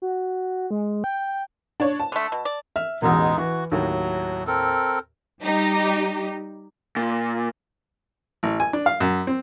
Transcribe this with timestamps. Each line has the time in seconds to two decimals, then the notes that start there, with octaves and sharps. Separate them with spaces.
0.02 F#4
0.71 G#3
1.04 G5
1.80 D4 C#5
2.00 A5
2.12 D3 A3
2.32 B2
2.45 D5
2.76 E5 F6
3.02 A1 E2 B2 G#3 D#4
3.38 E3 F#4
3.72 D#2 A2 F#3
4.47 C4 A4 A#4
5.42 G3 D#4 G4
6.97 A#2
8.43 A1
8.60 G#5
8.73 D4
8.86 F5
9.00 F#2
9.27 C4